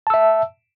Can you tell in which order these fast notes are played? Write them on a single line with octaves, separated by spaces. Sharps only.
A5 E6 E5